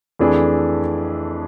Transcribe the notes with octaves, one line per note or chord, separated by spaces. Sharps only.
F2 E3 A3 D4 G#4